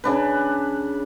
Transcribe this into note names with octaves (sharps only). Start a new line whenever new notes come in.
C#3 D4 B4